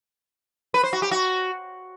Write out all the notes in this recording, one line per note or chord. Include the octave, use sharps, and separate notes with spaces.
B4
C5
F#4
G4
F#4